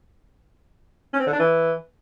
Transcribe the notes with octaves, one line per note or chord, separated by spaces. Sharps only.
C#4
C4
D3
D4
E3